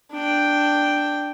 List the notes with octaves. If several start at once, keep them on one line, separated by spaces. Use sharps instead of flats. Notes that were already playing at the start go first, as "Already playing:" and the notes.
D4 G5